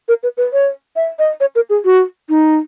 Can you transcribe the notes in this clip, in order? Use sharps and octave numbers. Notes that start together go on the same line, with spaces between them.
A#4
B4
B4
C#5
E5
D#5
C#5
A#4
G#4
F#4
D#4